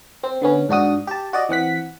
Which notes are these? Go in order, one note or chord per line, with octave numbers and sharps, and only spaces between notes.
C4
D3 B3 C#4
G#2 D4 F#4 D#6
G4 A5
F#4 D5 D#5
E3 C4 F#5 B6